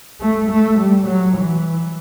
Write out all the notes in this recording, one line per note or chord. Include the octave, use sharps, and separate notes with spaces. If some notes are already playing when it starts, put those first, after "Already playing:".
A3
A3
G3
F#3
E3